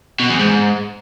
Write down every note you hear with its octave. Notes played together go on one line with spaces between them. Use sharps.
B2
E2
G#2